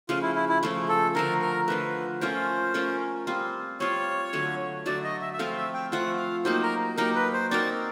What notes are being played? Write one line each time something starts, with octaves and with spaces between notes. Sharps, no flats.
C#3 F3 A3 F4
E4
E4
E4
C#3 F3 A3
A4
D3 F3 A3 A#4
A#4
D3 F3 A3 B4
A3 C#4 F4 A#4 C5
A3 C#4 F4 A#4
G3 C4 F4
G3 C4 F4 C#5
D3 F#3 A3
D3 F#3 A3 D5
D#5
E5
E5
F3 A3 C4 F4 F5
E5
G5
F3 A3 C4 F4 F#5
F5
F#3 A#3 D#4 G4 C5
A#4
F#3 A#3 D#4 G4 A#4
B4
C5
C4 D#4 F#4 A#4 D5